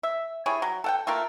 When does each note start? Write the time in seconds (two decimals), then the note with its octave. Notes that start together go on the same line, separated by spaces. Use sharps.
0.03 E5
0.46 G3 E4 G#4 C#5
0.62 F#3
0.84 A4 F#5 G5
1.07 A3 A#3 F4 A#4